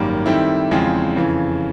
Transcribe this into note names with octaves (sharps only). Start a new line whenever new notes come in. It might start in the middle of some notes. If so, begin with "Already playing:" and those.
Already playing: G#1 F#2 D#3 G3 A#3
D#3 G3 C4 E4 A4
E2 C#3 F3 G#3 C4
F2 C#3 E3